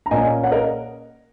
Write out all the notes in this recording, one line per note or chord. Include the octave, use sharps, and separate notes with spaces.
A#5
A#2 A#3 C#4 D#5 G#5
C#5 F#5
A#4 D#5